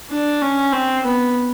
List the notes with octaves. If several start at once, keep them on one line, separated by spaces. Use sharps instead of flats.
D4
C#4
C4
B3